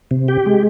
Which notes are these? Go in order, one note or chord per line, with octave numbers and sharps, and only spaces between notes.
C3
G4
G#3